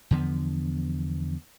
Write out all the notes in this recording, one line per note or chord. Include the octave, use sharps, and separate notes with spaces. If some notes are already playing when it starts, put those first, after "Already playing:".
E2 D3 F3 B3